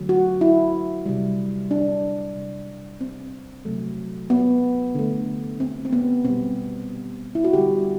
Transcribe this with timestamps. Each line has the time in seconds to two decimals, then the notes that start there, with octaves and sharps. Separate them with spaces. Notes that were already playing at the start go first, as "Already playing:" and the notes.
Already playing: D3 F#3 A3
0.09 F#4
0.41 E4
1.06 C3 G3
1.71 D4
2.36 C3 G3
3.01 C4
3.65 C3 F#3 A3
4.30 B3
4.95 D3 A3
5.60 C4
5.85 C4
5.93 B3
6.25 B2 G3 C4
7.35 E4
7.44 F#4
7.53 D3 G3 G4